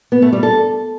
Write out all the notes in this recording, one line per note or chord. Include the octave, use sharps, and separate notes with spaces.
B3
A3
G3
A4